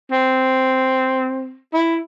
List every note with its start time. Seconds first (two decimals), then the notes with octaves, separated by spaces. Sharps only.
0.12 C4
1.74 E4